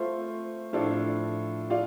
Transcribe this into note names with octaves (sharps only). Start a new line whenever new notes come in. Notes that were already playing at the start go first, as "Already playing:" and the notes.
Already playing: A3 F4 C5
A2 F3 D4 F4 A4
F4 D5 F5